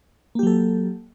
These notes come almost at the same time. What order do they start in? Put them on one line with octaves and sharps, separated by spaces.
A#3 G4 F#3 A4